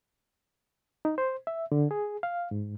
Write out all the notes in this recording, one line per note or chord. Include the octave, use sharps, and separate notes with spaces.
D#4
C5
E5
D3
G#4
F5
G#2